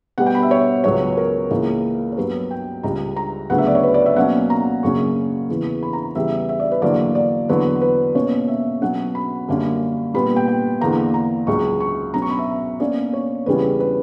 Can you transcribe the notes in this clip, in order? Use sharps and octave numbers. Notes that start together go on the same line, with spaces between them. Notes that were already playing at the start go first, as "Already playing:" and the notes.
B2 G3 B3 F#5
G5
B5
E5
C#5
C#2 C#3 F#3 B3 C#5
A#4
C#2 C#3 E3 A#3
C#5
G2 F#3 B3 B4
G5
C#2 C#3 G3 A#5
A#5
D2 C#3 F#3 B3 F#5
E5
D5
C#5
B4
D5
E5
B2 F#3 A#3 C#4 F#5
A#5
F#2 C#3 F#3 A#3 C#4 C#6
E2 C#3 E3 B3
B5
A#5
E2 C#3 E3 G3 B3 E5
E5
D5
B4
E2 D3 F#3 A#3 D5
D5
E2 D3 F#3 B3 B4
B4
B2 A#3 C#4 C#5
E5
B2 F#3 C#4 F#5
B5
F#2 D3 G3 A#3 C#4
A#2 G3 B3 B5
G5
G5
E2 D3 A#3 A#5
A#5
C#2 C#3 F#3 C#6
C#6
B2 F#3 C#4 A#5
C#6
B5
E5
B2 A#3 C#4 D5
C#5
E2 C#3 G3 C#4 B4
B4